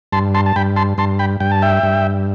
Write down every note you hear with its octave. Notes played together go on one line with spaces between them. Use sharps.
G2 A5 C6
A5 C6
A5
G2 G5 B5
A5 C6
G2 A5 C6
G5 B5
G2 G5
A5
E5 G5
G2